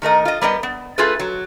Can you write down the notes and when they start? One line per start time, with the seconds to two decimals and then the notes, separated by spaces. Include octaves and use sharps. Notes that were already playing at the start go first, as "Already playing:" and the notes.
0.02 D#3 A3 A#4 D#5
0.25 F4 D#5
0.41 G3 B3 A#4 D#5
0.63 B3
0.98 A3 F4 G#4 A4 B4
1.19 F#3